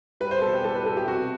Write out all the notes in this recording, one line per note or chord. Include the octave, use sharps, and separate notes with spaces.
G3 B4
C5
B2 A4
G4
G3 A4
B4
B2 A4
G4
C3 F#4